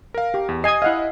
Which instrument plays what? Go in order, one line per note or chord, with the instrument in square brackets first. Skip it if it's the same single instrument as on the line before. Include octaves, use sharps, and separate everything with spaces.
[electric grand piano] A#4 F5
[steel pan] G4
[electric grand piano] E2
[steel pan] D#5 G#5 [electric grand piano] D#6 C7
[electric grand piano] E4 D#5 [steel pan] F5 F#5